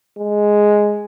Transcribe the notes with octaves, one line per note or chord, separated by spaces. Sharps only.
G#3